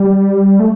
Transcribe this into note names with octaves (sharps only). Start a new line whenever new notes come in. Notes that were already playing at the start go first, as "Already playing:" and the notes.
Already playing: G3
A3